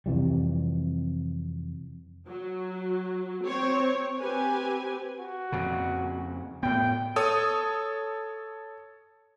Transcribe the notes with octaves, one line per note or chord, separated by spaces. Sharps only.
F2 C3 E3 G3
F#3
C4 C#5
C4 G4 B4 G#5
F#4
F2 A#2 C#3
A2 B3 G5
A4 C#5 D#6